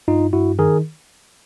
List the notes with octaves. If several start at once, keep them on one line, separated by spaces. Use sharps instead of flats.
G2 D#4 F4
G2 E4 F#4
D#3 G#4 A#4